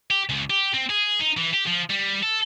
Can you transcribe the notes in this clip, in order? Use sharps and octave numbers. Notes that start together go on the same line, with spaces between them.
G4
C#2
G4
C4
G#4
D#4
E3
G4
F3
G3
A4